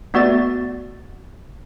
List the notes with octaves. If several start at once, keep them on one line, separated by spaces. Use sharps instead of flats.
A3 B3 F#4 D5 A6